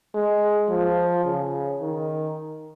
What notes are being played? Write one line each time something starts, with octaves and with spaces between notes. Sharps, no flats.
G#3
F3
C#3
D#3